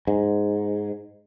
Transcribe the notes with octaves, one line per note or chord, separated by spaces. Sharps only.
G#2